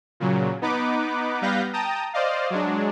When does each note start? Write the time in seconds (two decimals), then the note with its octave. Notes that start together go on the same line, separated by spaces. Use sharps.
0.20 A#2 C#3 F#3
0.62 B3 D#4 B4 D6
1.42 G3 B3 B4 F5 G6 A#6
1.73 G5 A5 A#5 D#6
2.14 C5 D5 D#5 F5
2.50 F#3 G#3 D4